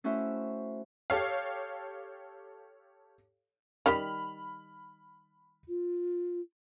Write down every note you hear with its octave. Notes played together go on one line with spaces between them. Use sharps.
A3 C#4 E4 F#4 C5 E5
G4 A4 C#5 F5
D#3 G3 G4 B5 F6
F4